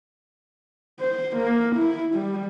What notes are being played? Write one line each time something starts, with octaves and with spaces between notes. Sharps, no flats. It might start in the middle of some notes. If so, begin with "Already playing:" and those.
C5
A#3
E4
G3